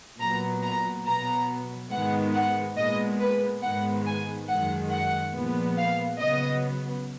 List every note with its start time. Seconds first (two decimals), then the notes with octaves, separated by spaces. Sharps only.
0.20 A#2 F#3 B3 A#5
0.63 A#5
1.05 B2 F#3 B3 A#5
1.91 G#2 D#3 G#3 B3 F#5
2.34 F#5
2.77 A#2 G#3 B3 D#5
3.20 B4
3.63 G#2 D#3 G#3 B3 F#5
4.06 G#5
4.49 F#2 D#3 G#3 F#5
4.92 F#5
5.34 A#2 F3 G#3 B3
5.78 F5
6.20 C#3 F#3 B3 D#5